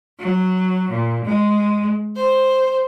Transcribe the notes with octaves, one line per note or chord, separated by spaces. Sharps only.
F#3
A#2
G#3
C5